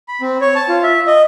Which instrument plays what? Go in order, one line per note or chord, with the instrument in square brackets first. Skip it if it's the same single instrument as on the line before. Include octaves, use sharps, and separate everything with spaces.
[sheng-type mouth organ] B5
C4
C#5
A5
F4
E5
D#5